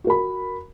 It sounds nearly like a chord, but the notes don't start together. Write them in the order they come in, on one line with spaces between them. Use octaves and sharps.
F#4 A#4 B5